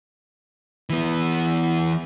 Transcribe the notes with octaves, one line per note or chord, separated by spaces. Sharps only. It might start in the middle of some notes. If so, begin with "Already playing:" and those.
E3 B3